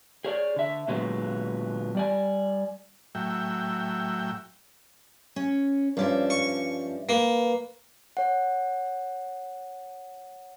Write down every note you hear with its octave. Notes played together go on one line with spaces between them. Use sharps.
G#4 C#5 D5
D3 E5
A#2 D3 F#3 G#3 B3
G3 D5 G#5
A2 F#3 E5 G5
C#4
G2 F3 C#4 D4 D5 E5
C#6
A#3 B4
C#5 F#5